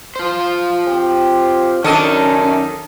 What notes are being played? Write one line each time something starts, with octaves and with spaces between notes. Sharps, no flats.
F4 C5
C4 G4
F#2 D#3 C#4 D4 A4 D#5